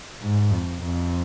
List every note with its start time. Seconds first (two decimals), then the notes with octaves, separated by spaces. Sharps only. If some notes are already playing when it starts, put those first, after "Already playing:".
0.22 G#2
0.52 F2
0.83 F2